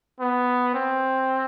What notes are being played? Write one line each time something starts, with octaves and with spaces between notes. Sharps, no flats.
B3
C4